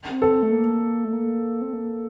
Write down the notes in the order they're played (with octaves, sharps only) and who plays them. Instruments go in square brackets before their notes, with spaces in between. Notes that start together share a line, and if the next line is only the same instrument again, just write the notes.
[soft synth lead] C4
[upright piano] A4
[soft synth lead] A3
A#3
A3
A#3
C4
A#3